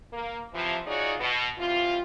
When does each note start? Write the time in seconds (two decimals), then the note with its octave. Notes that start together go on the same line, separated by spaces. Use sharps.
0.13 A#3
0.53 C3 E3 F3
0.87 D#4 F4 F#4 G#4 C#5 D5
1.20 B2
1.58 E3 G3 C4 F4